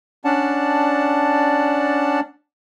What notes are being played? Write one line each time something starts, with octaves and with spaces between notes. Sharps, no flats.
C#4 D4 D5 F#5 A5